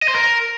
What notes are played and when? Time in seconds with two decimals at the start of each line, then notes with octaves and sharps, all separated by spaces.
0.02 D#5
0.08 C5
0.14 A#4